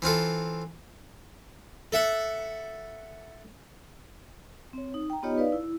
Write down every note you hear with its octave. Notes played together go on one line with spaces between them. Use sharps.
E3 C4 F4 A4
A4 E5 F#5
C4 C#5
D#4
G5 A#5
B3 D#4 F4 G4 C#5 D#5
D#4 B4 D5 F5
E4